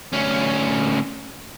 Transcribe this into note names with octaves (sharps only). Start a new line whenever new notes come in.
D2 C#4